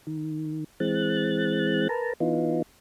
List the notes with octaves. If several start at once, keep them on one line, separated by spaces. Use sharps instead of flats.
D#3
E3 G#3 C4 F#6 A6
A#4 B4 A5 A#5
E3 B3 D#4 F4